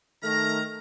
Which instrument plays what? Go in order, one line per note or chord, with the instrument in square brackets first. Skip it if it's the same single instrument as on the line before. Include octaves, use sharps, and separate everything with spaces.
[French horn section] D#3 A3 [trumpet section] A#5 [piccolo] F6